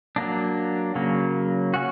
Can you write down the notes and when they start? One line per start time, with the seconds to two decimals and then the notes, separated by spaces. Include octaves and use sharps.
0.16 F#3 A#3 D4
0.95 C#3 F#3 A#3
1.74 C#4 F#4